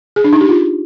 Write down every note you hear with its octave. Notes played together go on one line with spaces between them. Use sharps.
G#4
D4
D#4
G4
F4